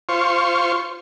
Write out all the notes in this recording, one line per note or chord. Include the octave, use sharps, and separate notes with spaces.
F4 C5 C#6